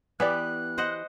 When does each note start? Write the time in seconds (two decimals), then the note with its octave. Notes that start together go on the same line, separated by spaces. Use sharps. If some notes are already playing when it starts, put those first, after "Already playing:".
0.20 E3 B3 G4 D5 F#6
0.78 C5 D#5 F#5